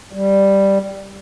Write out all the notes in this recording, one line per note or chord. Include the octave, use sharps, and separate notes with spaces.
G3